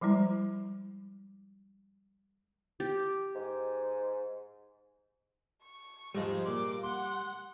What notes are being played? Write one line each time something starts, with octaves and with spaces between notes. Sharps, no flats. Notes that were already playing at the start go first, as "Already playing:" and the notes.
F3 G3 G#3 E4
G4
G#2
C#6
G#2 F3 G3 G#3
A#2 D6
F#5 C6